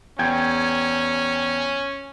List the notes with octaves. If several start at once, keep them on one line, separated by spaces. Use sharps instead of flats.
E2 C#4 G5 G#6